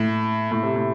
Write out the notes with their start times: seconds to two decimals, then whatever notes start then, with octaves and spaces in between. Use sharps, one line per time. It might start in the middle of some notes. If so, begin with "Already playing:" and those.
Already playing: A2
0.51 A2
0.63 C3
0.75 A2